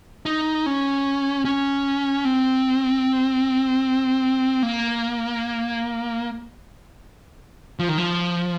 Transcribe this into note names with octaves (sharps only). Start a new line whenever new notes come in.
D#4
C#4
C#4
C4
A#3
F3
D#3
F3